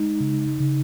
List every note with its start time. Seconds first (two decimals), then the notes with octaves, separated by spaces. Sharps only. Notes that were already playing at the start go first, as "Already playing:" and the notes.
Already playing: G#3 D#4
0.20 C#3
0.60 C#3